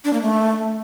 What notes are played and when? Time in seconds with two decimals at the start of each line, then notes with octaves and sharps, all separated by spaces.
0.04 D4
0.13 A#3
0.22 A3